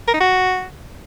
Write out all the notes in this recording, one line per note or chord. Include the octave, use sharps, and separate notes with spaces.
A#4
D#4
F#4